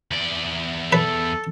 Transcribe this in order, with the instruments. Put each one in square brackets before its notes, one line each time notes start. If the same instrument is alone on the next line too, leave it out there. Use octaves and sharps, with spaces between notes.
[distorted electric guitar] E2 D5
[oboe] A4 [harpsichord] B4